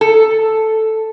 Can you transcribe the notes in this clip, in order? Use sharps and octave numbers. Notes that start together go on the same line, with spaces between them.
A4